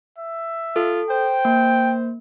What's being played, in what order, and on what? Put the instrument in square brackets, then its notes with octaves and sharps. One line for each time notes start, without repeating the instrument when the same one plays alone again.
[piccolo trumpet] E5
[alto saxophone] F4 [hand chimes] A4
[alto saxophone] C5 [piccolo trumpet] G5
[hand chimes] A#3